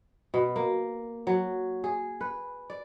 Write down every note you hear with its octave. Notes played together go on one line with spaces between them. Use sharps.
B2
A#3
F#3
G#4
B4
D5